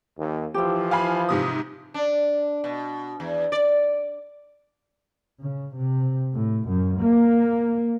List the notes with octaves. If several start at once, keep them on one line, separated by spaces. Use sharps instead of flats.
D#2
E3 F3 E4 G4
F5 G#5 B5
G#2 C3 D#6
D4
B2
E2
D5
C#3
C3
A2
F#2
A#3